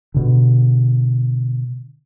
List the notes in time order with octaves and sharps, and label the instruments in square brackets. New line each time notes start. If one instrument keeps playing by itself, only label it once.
[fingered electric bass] B2 D3